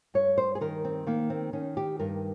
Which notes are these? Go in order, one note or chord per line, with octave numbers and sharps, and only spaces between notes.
G2 C#5
C5
G#4
D#3 A#4
C4
D#3 A#3
C4
D#3 C#4
G4
G2 A#4